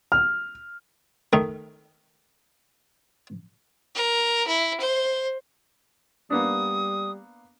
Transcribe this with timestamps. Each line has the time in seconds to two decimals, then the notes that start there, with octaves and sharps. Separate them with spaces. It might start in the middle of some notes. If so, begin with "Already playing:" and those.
0.12 F6
1.33 D#3 A3 D#4
3.95 A#4
4.47 E4
4.80 C5
6.30 G3 A#3 B3 D4 D#6